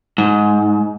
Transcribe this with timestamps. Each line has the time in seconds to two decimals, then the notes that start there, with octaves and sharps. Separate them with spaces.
0.18 G#2